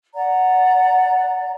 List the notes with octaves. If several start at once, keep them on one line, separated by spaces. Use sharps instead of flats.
D5 F#5 A#5